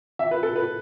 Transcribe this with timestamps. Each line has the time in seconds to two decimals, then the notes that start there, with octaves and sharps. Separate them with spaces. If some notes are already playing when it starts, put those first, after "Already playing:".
0.19 E5
0.31 B4
0.43 A4
0.56 B4